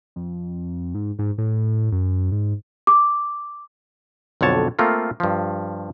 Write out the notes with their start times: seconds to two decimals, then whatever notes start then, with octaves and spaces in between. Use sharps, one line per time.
0.16 F2
0.95 G#2
1.19 G#2
1.38 A2
1.92 F#2
2.32 G#2
2.87 D6
4.41 B1 F2 D3 C#5 A5
4.79 A3 A#3 C4 F4
5.20 G2 F3